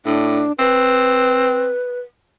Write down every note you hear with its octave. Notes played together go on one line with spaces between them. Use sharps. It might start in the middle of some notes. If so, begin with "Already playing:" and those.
A2 D4
C4 B4